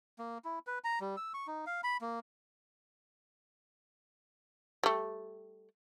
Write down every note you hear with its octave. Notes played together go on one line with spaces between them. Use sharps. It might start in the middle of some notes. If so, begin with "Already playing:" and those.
A#3
E4
B4
A#5
G3
E6
C#6
D#4
F5
B5
A#3
G3 A3